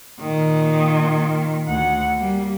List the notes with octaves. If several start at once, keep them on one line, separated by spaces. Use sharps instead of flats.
A#2 D#3
D2 F#5
G3 A#3